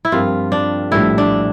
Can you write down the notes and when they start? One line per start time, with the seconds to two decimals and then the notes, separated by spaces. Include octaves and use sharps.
0.05 E4
0.12 G2 F3 C4 F4 G4 A#4
0.52 D4
0.91 A#1 A2 G3 E4
1.18 D4